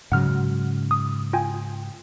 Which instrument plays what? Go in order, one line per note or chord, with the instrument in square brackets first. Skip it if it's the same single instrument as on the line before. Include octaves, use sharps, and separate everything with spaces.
[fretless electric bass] G#2 C#3 F#3 [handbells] F#5 F6
[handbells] D#6
F4 G5 G#5